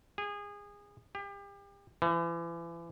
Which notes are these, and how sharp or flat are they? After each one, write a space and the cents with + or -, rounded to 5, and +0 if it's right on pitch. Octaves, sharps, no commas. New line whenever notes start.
G#4 -25
G4 +35
E3 +35